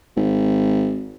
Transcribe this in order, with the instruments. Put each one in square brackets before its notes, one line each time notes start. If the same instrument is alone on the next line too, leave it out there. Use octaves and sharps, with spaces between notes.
[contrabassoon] G#1